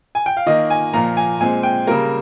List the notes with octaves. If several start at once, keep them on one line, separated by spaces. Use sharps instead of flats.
G#5
G5
F5
D#3 A#3 D#5
G#5
A#2 F3 A#3 A#5
G#5
A#2 G#3 C4 G#5
G5
C#3 G3 A#3 A#4